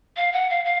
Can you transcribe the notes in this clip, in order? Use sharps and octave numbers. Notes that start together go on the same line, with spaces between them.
F5
F#5
F5
F5